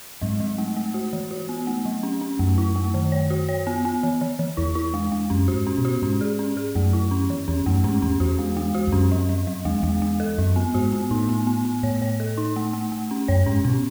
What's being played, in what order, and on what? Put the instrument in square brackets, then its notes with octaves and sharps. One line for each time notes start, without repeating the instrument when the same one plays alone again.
[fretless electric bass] G#2 [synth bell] F#3
[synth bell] F#3
A3
A3
F#4
E3
F#4
B3
A3
F#3
C#4
C#4
[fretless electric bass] F#2 [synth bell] A3
[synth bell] E4
A3
D#3
C#5
F#4
C#5
B3
B3
E3
E3
E3
[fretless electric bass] E2 [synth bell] E4
[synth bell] E4
G#3
G#3
[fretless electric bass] F#2 [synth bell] C#4
[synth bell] F#4
[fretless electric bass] G#2
[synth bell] C#4
[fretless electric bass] B2
[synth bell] F#4
[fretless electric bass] G#2 [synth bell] C#4
[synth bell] G#4
C#4
G#4
[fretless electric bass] F#2 [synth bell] A3
[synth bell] E4
C#4
E3
[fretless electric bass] E2 [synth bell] C#4
[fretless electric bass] F#2 [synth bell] A3
[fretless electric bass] G#2 [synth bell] C#4
[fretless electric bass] E2 [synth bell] C#4
[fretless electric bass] E2 [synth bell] F#4
[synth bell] G#3
G#3
F#4
[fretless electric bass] E2
[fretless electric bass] F#2 [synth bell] C#4
[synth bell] F#3
F#3
F#3
[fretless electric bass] E2 [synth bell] G#3
[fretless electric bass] E2 [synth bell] G#3
[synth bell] G#3
A4
[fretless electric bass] F#2 [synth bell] F#3
[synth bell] B3
[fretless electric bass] G#2 [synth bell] F#4
[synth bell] B3
[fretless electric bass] A2 [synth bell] D#4
[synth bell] B3
B3
B3
[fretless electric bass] A2 [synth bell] C#5
[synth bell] C#5
A4
D#4
A3
A3
A3
C#4
[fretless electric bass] F#2 [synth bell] C#5
[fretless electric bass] G#2 [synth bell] C#4
[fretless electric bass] B2 [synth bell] C#4